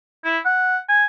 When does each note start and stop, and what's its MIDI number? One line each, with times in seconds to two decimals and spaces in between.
0.24 0.39 64
0.45 0.78 78
0.89 1.05 80